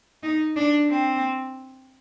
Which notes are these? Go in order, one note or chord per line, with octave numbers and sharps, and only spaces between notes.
D#4
D4
C4